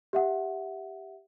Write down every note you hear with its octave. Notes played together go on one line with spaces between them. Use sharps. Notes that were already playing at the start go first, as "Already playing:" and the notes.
G4 E5 F#5